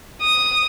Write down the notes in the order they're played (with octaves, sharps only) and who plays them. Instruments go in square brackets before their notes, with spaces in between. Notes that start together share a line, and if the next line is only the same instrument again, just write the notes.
[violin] D#6